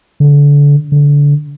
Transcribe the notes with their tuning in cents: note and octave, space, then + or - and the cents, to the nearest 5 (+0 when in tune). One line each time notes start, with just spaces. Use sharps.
D3 -30
D3 -25